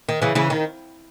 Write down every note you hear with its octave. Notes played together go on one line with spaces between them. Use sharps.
D#3
C#3 E3
C#3 E3
D#3